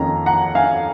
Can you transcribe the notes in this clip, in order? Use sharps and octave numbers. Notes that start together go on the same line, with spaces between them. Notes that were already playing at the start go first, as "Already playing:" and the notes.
Already playing: F2 D#3 A#3 C#4 F4 A#5
F#5 A#5
F5 G#5